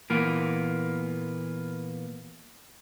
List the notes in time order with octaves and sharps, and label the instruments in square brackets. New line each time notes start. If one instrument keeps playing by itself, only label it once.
[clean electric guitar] A#2 E3 A#3 B3